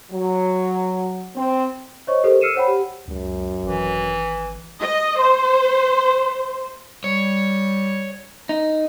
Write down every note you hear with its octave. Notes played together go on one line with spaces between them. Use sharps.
F#3
C4
C5 C#5 D#5 C#6
G4 A4 A#4 C5
E6 F6 C7 C#7 D#7 E7
C5 C#5 F#5 G5 B5
G4
C#2 F#2
G#1 E3
D#5
C5
G3 C#5
D#4